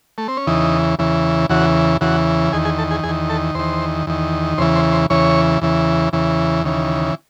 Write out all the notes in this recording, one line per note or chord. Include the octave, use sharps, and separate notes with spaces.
A3
C4
C#4
E2 C#3 E3 D#4
E2 C#3 E3
E2 C#3 E3 F#4
E2 C#3 E3 F#4
E2 D#3 G#4
G#4
A4
G#4
E2 D#3 G#4
A4
E2 D#3 C5
E2 D#3
E2 C#3 E3 C5
C5
C5
E2 C#3 E3 C#5
E2 C#3 E3
E2 C#3 E3
D#2 C#3 E3